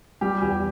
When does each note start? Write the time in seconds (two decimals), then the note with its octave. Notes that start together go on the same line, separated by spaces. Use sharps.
0.21 G3 G4
0.41 E2 G4